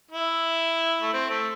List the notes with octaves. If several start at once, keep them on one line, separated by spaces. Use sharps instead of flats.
E4
A3
C4
A3